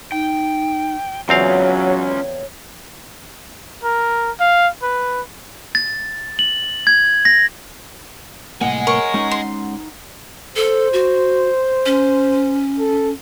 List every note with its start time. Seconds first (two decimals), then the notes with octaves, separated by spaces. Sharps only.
0.12 D#4 G5
1.29 E2 F#3 C4 C#4 F4 C#5 F5
3.83 A#4
4.40 F5
4.83 B4
5.75 A6
6.39 F#7
6.87 G#6
7.25 A#6
8.61 C2 A2 A#3 D#5 F#5 G#5
8.87 A#4 C#5 C#6
9.14 G#3 C#4 D#4 F#5
9.31 C6
10.56 A4 C5
10.93 F#4
11.86 C#4
12.79 A4